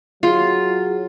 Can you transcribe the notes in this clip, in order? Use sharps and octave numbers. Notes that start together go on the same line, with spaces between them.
F#3 F4 G#4